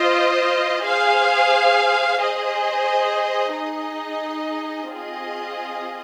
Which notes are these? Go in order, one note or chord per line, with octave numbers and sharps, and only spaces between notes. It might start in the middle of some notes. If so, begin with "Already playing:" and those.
Already playing: F4 C5 D#5
G#4 C5 F5 G#5
G#4 C5 D#5
D#4 G#4 D#5
C4 F4 G#4 D#5